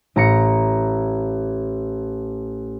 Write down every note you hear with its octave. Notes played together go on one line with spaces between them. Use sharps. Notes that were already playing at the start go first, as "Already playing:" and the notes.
A1 A#5 C#7